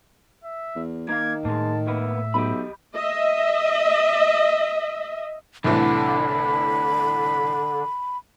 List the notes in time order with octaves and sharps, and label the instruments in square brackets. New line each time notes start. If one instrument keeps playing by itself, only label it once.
[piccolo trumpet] E5
[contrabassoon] E2
[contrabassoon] D#3 [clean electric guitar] A#3 F5 [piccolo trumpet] G#6
[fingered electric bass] A2 [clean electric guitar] G#3 A#3 [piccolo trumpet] A5
[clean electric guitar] A#3 B3 [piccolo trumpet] E5
[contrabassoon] B1 [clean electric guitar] G4 D#5 B5
[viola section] D#5 E5
[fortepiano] C2 A2 E3 [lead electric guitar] D3 [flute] B5